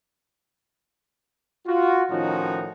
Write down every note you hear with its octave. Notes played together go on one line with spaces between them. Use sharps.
F4 F#4
A2 D#3 F3 C#4 D#4 F#4